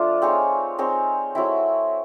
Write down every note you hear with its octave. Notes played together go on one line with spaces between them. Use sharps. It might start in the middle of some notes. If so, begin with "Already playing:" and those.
Already playing: F3 A3 D4 F4
C4 D#4 G#4 C#5
C4 D#4 G#4 C#5
F#3 A3 C4 E4